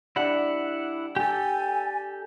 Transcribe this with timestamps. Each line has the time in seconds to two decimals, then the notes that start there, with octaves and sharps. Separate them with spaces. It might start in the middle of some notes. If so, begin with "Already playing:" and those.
0.16 G3 D4 E4 F#5
1.16 G4 A4 G#5